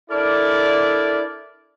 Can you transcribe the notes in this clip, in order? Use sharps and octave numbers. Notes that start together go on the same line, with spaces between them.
D4 E4 A4 A#4 D5